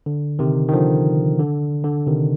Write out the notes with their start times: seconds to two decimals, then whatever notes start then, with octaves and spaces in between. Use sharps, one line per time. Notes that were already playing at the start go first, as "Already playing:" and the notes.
0.06 D3
0.39 C3 D#3
0.69 D#3
0.73 D3 F3
1.39 D3
1.84 D3
2.06 C3 D#3